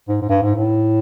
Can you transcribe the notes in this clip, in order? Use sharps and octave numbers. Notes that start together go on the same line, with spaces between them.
G#2
G#2
G2
G#2
A2